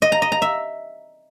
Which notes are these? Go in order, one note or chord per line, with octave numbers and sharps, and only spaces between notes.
D#5
A#5
D#5
A#5
E5